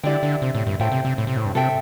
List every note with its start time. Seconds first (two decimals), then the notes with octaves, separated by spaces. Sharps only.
0.03 D3 E4 G4 D5 G5
0.23 D3
0.42 C3
0.55 A2
0.67 G2
0.80 A2 A4 C5 E5 G5
0.92 C3
1.05 C3
1.18 A2
1.27 C3
1.37 A2
1.45 G2
1.55 C3 A4 E5 G5